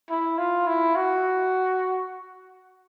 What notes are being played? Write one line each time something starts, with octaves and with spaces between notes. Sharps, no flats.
E4
F4
E4
F#4